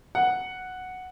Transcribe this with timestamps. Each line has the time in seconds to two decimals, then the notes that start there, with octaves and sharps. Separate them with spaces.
0.15 F#5